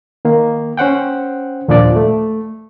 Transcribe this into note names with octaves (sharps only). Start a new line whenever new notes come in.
D#3 A#3
C#4 C5 F#5 G5
D#2 A#2 F3 D4 D5
A3